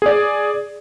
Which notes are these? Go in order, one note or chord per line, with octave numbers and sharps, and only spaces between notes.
G#4 D5